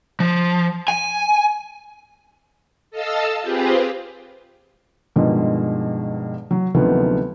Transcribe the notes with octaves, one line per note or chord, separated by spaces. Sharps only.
F3
G#5
A4 D#5 F5 A5 E6
C4 F4 G4 G#4 B4 C5
G2 B2 D#3 F3 G#3
F#3
D2 C3 D#3 F3 F#3 B3